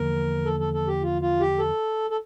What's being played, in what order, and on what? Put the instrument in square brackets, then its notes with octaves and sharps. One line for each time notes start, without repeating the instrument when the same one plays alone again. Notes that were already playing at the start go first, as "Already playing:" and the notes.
Already playing: [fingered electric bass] E2 D3 F3 A#3 [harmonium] A#4
[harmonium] A4
A4
A4
G4
F4
F4
G4
A4
A4